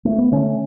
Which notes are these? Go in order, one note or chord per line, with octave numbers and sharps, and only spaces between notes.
A3
B3
D3 A3 C#4